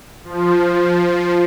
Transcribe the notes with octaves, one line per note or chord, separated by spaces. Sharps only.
F3